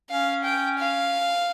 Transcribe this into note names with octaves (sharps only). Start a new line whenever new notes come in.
C#4 F5
G5
F5